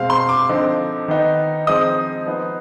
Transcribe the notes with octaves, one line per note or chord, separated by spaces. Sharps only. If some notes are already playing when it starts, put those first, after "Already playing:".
Already playing: B2 G#3 C4 F5
C6
D6
D3 F3 C4 D#4
D#3 B3 D#4
F3 G#3 C4 D#4 D#6
F3 B3 D#4